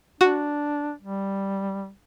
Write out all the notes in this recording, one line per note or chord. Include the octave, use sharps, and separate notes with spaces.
D4 F#4
G3